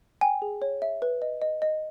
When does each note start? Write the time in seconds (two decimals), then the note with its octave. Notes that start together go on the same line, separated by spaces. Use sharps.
0.21 G5 G#5
0.42 G#4
0.62 C#5
0.82 E5
1.02 B4
1.22 D#5
1.42 D#5
1.62 D#5